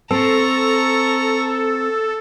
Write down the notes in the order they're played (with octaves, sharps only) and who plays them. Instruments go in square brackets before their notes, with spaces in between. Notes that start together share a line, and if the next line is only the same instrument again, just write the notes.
[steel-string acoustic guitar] C4 [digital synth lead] A4 [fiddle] A#5 C#6